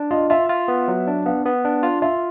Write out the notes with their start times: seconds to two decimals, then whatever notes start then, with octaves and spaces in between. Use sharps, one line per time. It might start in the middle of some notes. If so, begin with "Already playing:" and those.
Already playing: D4
0.11 F4 D#5
0.30 F4 E5
0.49 F4
0.68 B3
0.88 F#3
1.07 D4
1.26 B3 F5
1.46 B3
1.65 D4
1.83 F4
2.02 F4 E5